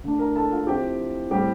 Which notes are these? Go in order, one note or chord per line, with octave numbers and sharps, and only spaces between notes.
D3 A3 D4
A#4 A#5
A4 A5
F4 F5
F3 C4 E4 G4 G5
A2 G3 C4 G4 G5